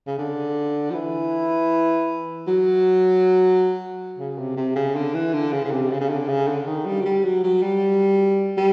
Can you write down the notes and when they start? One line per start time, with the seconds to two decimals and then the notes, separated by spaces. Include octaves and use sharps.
0.07 C#3
0.18 D3
0.90 F3
0.94 E3
2.48 F#3
4.19 C#3
4.38 C3
4.57 C3
4.76 C#3
4.95 D3
5.14 E3
5.33 D3
5.53 C#3
5.65 C#3
5.71 C3
5.91 C#3
6.01 C#3
6.09 D3
6.29 C#3
6.48 D3
6.67 D#3
6.86 G3
7.00 F#3
7.05 G3
7.24 F#3
7.43 F#3
7.62 G3
8.57 G3